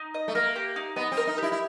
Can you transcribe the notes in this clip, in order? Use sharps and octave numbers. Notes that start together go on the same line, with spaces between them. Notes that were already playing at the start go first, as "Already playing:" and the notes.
Already playing: D#4
D#5
A3
A#3 A#4
G4
D#4
B3 D#5
C4
A#4
D#4
E4 G4
E4